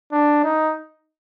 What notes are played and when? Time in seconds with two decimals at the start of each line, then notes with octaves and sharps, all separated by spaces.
0.12 D4
0.44 D#4